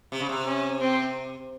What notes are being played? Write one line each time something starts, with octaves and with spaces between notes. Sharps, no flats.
C3
C#3
C3
C#4
C4